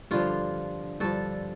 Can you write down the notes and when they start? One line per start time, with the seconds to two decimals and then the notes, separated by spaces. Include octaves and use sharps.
0.11 G2 D3 F3 F4
1.00 G2 D3 F3 A4